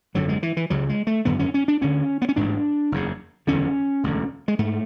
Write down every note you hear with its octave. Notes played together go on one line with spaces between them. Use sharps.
G#1 F#2 D3 F#3
G#3
E3
E3
C#2 C#3 F#3
G#3
A3
G#1 F#2 D3 B3
C#4
C#4
D4
D2 D3 C#4
B3
C#4
A1 G#2 D4
F#1 E2 C#3
F#1 E2 D3 C#4
E1 D2 D3
G#3
G#2 A3